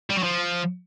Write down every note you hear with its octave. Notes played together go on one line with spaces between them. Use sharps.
G3
F#3
F3